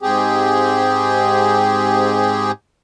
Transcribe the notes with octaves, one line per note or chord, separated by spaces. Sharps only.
G#2 C4 G4 G#4